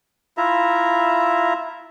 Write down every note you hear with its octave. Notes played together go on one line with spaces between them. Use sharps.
E4 F4 E5 A#5